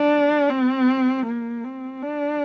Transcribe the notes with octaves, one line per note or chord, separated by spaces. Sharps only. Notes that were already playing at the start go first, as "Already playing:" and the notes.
Already playing: D4
C4
A#3
C4
D4